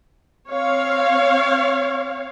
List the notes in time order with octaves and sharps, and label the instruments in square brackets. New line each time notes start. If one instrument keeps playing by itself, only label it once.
[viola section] C4 C#5 F5